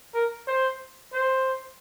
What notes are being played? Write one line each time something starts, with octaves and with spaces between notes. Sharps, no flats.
A#4
C5
C5